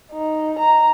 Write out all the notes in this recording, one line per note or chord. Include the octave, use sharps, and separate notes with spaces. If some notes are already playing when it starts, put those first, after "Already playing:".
D#4
A#5